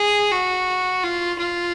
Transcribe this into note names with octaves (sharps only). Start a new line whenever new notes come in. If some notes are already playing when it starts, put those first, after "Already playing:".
Already playing: G#4
F#4
F4
F4